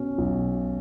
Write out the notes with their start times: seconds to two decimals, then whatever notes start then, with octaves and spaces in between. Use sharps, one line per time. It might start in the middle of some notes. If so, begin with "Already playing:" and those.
Already playing: B2 C#4
0.18 B1